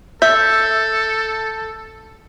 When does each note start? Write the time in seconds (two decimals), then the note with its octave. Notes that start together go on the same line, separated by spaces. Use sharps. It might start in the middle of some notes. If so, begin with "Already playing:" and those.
0.22 A4 E5 E6 G6